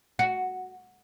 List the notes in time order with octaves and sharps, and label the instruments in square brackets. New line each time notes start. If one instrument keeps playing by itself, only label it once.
[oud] F#4